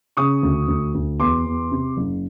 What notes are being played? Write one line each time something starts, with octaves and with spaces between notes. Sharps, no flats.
C#3 C#6 D#6
D2
D2
D2
E2 C6 D6
E2
C3
F#1